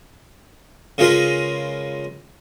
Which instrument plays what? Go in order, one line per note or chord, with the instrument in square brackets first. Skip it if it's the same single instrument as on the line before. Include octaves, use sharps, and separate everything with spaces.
[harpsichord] C#3 G#3 F4 A#4 B4